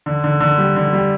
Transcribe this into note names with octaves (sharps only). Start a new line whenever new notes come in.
D3
D3
D3
G3
D3
G3